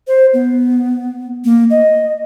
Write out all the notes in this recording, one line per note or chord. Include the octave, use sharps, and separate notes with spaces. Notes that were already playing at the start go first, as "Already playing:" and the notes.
C5
B3
A#3
D#5